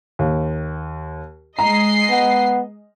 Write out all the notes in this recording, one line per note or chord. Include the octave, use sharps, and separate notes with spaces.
D#2
G#3 D#5 A#5 C7
B3